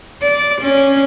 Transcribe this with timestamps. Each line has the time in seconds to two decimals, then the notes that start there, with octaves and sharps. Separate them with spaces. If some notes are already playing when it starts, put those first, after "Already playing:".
0.22 D5
0.62 C#4